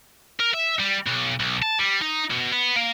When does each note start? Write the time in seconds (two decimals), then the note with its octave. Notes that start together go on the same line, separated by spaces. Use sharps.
0.40 A#4
0.54 E5
0.79 G3
1.07 B1
1.40 B1
1.62 A5
1.79 G3
2.02 D#4
2.31 B2
2.53 B3
2.76 A#3